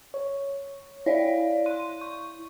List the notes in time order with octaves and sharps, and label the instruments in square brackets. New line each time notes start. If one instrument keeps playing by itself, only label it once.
[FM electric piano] C#5
[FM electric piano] E4 [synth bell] C#5 D5 F5
[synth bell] C6 D#7
C#6